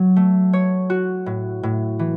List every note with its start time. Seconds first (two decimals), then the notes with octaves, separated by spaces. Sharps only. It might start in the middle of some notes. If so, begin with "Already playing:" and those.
Already playing: F#3
0.16 A3
0.53 C#5
0.90 F#4
1.26 A2
1.63 A2
1.99 E3